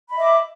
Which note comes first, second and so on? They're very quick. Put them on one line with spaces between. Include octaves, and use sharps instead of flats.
B5 D#5 E5 D6